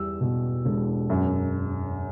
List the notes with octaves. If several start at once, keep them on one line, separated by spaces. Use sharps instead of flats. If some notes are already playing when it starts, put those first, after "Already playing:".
Already playing: E2 G3 E6
B2
E1
F#2